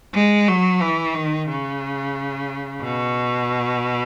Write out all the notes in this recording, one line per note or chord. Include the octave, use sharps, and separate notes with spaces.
G#3
F#3
E3
D#3
C#3
B2